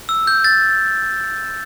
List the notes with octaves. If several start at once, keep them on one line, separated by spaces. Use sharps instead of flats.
E6
G6
A6